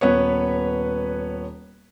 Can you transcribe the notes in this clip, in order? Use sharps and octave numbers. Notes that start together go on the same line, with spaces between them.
D#1 B3 B4 C#5